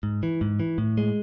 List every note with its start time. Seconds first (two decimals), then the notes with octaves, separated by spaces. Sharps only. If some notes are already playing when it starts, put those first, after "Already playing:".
0.03 G#2
0.23 E3
0.41 G#2
0.60 E3
0.78 A2
0.97 G#3